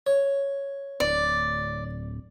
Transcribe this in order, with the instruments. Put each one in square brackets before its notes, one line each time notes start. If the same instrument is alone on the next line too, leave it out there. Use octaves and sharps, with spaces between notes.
[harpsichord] C#5
[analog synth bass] D1 [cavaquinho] D5